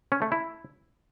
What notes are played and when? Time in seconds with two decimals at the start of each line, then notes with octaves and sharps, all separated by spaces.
0.12 C#4
0.22 A3
0.32 E4